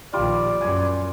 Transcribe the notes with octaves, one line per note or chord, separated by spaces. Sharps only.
A#1 D#3 G3 F4 D5
F#2 G#5